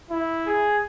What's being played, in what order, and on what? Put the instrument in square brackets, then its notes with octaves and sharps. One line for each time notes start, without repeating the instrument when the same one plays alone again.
[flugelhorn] E4
[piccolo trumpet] G#4